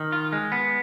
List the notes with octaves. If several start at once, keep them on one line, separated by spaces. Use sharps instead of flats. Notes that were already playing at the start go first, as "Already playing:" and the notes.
Already playing: D#3
F4
G#3
B3